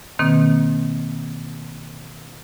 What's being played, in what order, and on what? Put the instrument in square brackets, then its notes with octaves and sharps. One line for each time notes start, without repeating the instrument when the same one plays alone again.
[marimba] B2 D#3 A#3 C4